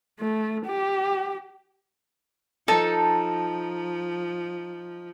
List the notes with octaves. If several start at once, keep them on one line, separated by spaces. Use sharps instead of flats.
A3
G4
F3 D#4 A4 A5